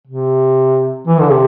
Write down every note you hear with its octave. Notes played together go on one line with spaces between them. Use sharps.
C3
E3
D3
C3